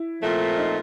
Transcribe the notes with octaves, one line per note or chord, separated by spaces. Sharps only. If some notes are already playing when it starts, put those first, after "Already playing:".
Already playing: E4
A#2 F3 A3 C4 F4
D#4